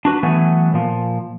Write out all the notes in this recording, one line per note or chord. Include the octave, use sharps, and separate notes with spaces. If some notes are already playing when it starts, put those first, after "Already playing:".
D4 F#4 B4
E3 F#3 A3 B3 G#5
A#2 F3